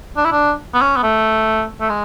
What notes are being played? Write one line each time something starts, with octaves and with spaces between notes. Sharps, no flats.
D4
E4
D4
B3
C#4
B3
A3
A3
G#3